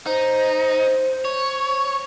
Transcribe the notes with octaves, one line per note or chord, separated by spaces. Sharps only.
D#4 C5
C#5